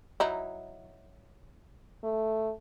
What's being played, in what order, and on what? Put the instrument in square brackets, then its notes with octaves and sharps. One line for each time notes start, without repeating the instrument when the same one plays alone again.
[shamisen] F#3 D#4 E4
[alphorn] A3